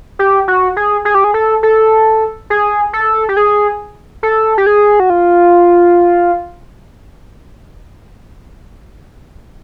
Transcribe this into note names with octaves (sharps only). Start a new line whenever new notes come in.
G4
F#4
G#4
G#4
G4
G#4
A4
A4
G#4
A4
G4
G#4
A4
G4
G#4
F#4
F4